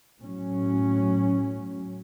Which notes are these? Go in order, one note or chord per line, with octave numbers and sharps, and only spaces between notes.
A2 F#3 C#4